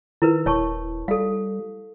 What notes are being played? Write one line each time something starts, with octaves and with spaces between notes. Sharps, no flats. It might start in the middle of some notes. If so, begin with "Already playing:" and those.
D#3 E4 A#4 B4
D#1 C#5 A5 C#6
G3 A4 F5